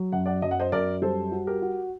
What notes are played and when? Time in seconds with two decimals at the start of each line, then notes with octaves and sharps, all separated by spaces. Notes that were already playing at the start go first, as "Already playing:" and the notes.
Already playing: F#3
0.12 F#2 F#5
0.26 D5 F#5
0.42 F#2 D#5
0.51 F#5
0.60 C5 D#5
0.72 F#2 A#4 D5
1.02 G3 A4 C5
1.32 F#4
1.47 G4 A#4
1.62 F#4